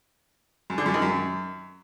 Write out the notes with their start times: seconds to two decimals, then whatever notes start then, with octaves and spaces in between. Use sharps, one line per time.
0.70 F#2
0.78 D3
0.86 F#2
0.94 D#3
1.02 F#2